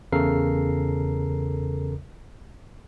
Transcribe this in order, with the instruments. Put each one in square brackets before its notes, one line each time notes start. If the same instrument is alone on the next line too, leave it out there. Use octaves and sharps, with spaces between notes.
[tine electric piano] E2 C#3 A4 A#4 A#5 C7